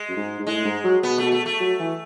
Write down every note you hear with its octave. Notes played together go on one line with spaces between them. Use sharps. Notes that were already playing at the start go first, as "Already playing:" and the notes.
Already playing: G#3
F#2
G#2
G#2
A2 G#3
G#2
F#3
B2 B3
B2 A3
A3
A3
F#3
E3